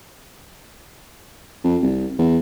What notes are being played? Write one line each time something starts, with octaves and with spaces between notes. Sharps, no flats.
F2
C2
E2